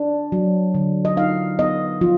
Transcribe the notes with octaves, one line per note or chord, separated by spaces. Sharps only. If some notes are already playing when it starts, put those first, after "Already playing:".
Already playing: D4
F#3
D3
D#5
D#4 F5
B3 D#5
F3 F4